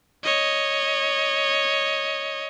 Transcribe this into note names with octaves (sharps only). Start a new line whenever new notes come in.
C#5 D#5